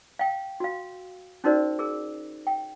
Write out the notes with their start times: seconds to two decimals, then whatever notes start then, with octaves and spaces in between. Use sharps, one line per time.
0.19 F5 G5
0.60 F#4 F5
1.44 C#4 D#4 F#4 A#4 C5 D5
1.79 G#4 A#4
2.47 G5